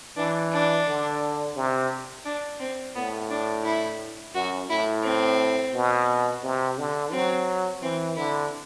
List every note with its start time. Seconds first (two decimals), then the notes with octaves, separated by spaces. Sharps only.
0.16 E3 D4
0.52 D4
0.87 D3
1.56 C3
2.25 D4
2.60 C4
2.95 A2 B3
3.30 D4
3.64 E4
4.34 F#2 F#4
4.69 A2 E4
5.03 C4
5.74 B2
6.44 C3
6.78 D3
7.13 F#3 C4
7.82 E3 C4
8.17 D3 E4